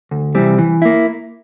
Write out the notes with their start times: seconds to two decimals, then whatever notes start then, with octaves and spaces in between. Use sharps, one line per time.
0.11 D2
0.35 C3 E3 G3 C4
0.58 E3
0.82 A#3 E4